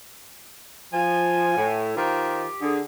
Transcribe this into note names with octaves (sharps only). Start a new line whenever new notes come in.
F3 G#5
A2
D#3 F4 G4 C5
D3 G#4